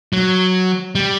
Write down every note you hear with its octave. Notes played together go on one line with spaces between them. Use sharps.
F#3
G3